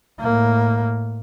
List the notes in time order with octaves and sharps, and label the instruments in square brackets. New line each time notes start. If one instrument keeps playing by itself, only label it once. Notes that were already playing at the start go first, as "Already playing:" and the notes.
[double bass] A2 A#3